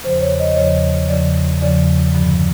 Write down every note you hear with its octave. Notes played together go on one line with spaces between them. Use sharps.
E2 C#3 F3 C5
C#5
D#5
E2 C#3 F3 C#5
E2 C#3 F3 D5
E2 C#3 F3 D5
G2 D3 F3